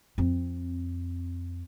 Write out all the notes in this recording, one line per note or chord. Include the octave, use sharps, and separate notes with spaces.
F2 C4